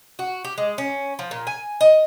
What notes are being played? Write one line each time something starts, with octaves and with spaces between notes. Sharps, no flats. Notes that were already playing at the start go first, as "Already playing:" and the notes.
F#4
G4
G#3
C#4
F3
A#2
G#5
D#5